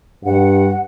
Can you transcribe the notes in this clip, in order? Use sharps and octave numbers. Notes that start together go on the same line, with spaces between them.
G2 F#5